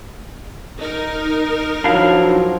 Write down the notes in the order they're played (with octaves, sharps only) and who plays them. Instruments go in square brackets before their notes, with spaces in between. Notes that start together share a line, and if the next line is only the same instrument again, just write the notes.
[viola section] D#4 A#4
[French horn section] F3 F#3 [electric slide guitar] D4 E4 F5